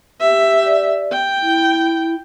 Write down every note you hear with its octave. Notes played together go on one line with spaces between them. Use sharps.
G4 E5
D5
G5
E4